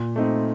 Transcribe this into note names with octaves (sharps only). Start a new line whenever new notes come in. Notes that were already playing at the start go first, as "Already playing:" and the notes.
Already playing: A#2
A3 C4 D#4